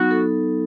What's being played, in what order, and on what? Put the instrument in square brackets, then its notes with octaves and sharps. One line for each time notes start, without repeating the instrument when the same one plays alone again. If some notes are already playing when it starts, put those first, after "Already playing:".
Already playing: [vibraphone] F#3 B3 D#4 [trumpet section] F#4
[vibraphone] A4